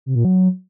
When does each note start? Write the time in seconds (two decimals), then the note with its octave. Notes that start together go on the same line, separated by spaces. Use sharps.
0.06 C3
0.15 A#2
0.25 F#3